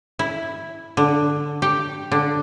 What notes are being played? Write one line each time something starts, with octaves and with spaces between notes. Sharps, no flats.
E4
D3
G4
D3